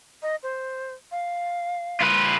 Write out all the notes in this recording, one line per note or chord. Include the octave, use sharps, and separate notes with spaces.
D#5
C5
F5
F4 B4